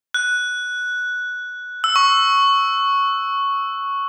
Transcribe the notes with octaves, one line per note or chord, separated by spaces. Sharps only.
F#6
E6
C#6